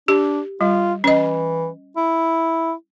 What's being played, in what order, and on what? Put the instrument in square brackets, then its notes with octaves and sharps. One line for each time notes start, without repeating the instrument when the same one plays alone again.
[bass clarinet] D4 [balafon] G4
[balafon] G3 [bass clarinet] F4
[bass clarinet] E3 [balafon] C#4 D#5
[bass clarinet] E4